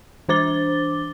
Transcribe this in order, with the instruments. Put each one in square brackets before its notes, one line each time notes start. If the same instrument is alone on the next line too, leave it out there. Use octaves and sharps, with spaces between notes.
[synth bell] E3 D4 C5 D6 A6 G7